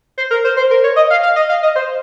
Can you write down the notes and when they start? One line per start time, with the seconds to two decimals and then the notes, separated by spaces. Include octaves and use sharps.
0.18 C5
0.31 A#4
0.44 C5
0.57 C5
0.71 A#4
0.84 C#5
0.96 D#5
1.10 F5
1.23 F5
1.36 D#5
1.49 F5
1.63 D#5
1.76 C5